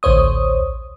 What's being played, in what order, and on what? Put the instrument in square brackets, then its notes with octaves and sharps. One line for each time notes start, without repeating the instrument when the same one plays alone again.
[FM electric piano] A1 D2 C5 C#5 D#6